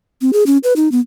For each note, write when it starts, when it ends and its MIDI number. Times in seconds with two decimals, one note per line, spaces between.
0.21 0.31 60
0.33 0.44 68
0.47 0.58 61
0.64 0.73 71
0.76 0.91 63
0.92 1.00 59